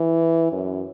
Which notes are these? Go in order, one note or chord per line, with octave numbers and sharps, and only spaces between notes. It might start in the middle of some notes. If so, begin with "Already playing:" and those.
Already playing: E3
F#2